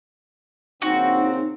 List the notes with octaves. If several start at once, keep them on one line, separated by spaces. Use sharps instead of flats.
A#1 C#3 C4 D#4 F#4